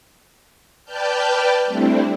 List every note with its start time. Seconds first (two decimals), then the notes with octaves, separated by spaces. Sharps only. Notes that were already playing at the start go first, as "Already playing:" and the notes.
0.84 B4 D5 G5 A5 F6 G6
1.65 G3 A3 C4 D4 E4